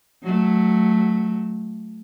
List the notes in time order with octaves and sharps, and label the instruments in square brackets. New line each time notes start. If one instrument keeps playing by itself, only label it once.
[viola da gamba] F#3 A3